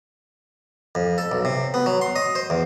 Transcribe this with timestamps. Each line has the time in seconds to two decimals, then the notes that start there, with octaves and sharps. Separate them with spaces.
0.95 F2
1.18 A4
1.32 B1
1.45 C3
1.74 B3
1.86 F#3
2.01 C6
2.16 D#5
2.35 C5
2.50 E2